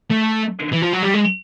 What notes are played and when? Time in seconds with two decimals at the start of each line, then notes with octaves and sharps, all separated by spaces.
0.11 A3
0.73 E3
0.83 F3
0.93 F#3
1.03 G3
1.14 G#3